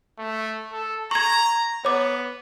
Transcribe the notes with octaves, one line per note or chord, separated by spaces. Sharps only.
A3
A4
A#5 C#6 G#6
B3 C#5 D6